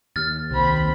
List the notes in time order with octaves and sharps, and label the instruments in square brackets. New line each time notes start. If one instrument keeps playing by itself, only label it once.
[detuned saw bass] D#2 [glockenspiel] F6 A6
[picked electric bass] C2 [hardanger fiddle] C4 B5